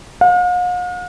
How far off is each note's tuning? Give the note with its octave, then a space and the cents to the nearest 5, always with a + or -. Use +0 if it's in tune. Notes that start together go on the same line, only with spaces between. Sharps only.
F5 +45